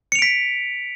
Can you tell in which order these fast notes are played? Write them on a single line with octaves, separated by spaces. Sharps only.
C#7 F7 D7 B6